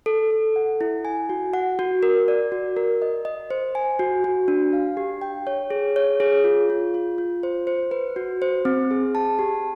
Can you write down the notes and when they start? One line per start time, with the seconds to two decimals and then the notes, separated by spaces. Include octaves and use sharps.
0.06 A4
0.31 A4
0.56 F#5
0.81 E4
1.05 G#5
1.29 F#4
1.54 F#5
1.79 F#4
2.03 A#4
2.28 D5
2.52 F#4
2.77 A#4
3.02 D#5
3.25 D#5
3.50 C5
3.75 G#5
3.99 F#4
4.24 F#4
4.48 D4
4.73 F5
4.97 G4
5.21 G5
5.47 C#5
5.70 G#4
5.96 C#5
6.20 G#4
6.44 F4
6.70 F4
6.94 F4
7.18 F4
7.43 C5
7.67 C5
7.91 B4
8.16 F#4
8.42 C5
8.65 C4
8.91 G#4
9.15 A5
9.39 G4